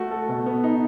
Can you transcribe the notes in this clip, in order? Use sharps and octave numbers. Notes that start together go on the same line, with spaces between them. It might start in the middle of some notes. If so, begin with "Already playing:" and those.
Already playing: A3 F#4
A4
B2
B3
D#4